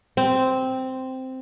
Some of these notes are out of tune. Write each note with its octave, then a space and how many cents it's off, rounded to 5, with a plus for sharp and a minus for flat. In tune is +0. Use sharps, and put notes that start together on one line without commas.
C4 -5